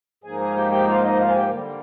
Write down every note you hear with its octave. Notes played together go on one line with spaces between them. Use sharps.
G#2 F3 A#3 D#4 G#4 G#5
G#4 G#5
F5
G4 G5
G4 G5
F4 F5
D#4 D#5
F4 F5
G#5
G4 G5
D3 G3 A#3